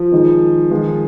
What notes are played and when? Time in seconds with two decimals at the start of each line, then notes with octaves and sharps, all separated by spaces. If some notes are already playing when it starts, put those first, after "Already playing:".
Already playing: F3
0.12 D#3 G#3 D#4
0.71 D#3 G#3 F4